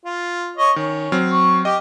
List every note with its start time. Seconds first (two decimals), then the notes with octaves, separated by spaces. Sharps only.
0.05 F4
0.57 C#5 D#5
0.76 D#3 C#4
1.12 F#3 C4 F6
1.31 C#6
1.65 G4 D#5